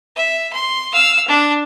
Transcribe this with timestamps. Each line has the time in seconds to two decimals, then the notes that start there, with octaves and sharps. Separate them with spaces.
0.16 E5
0.53 C6
0.93 F5 E6
1.28 D4